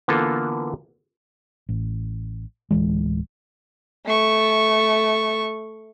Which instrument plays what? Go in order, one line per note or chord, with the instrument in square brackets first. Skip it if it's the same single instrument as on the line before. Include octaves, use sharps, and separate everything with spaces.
[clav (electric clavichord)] D3 E3 A#3 B3 F4 A4
[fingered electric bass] A1
D1 C2 E3 G#3
[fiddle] A3 C#6